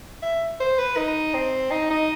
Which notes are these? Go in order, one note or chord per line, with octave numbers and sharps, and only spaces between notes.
E5
C5
B4
D#4
C4
D#4
D#4